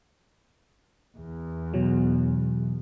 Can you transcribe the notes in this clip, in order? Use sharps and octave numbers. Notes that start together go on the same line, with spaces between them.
E2
B2 F#3